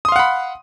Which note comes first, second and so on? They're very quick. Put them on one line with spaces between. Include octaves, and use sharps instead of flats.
D#6 C6 F5 F#5 B5